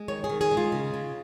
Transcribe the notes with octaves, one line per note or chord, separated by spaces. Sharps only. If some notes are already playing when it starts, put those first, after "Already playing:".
Already playing: G#3
D#3 C#5
G#4
D#3
G#4
G#3
F4
C#3
C#3